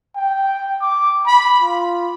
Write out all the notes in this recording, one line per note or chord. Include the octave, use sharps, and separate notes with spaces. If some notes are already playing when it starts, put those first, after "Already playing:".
G5
D6
B5
F4